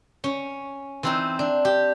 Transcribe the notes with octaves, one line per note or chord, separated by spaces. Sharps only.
C#4
E3 C4 D#4
D4
G4